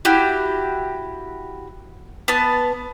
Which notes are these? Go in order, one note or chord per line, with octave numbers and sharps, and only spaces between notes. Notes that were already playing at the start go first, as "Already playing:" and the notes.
E4 F#4 G4
B3 A5